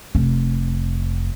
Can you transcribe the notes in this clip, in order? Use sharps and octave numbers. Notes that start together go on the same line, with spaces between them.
F1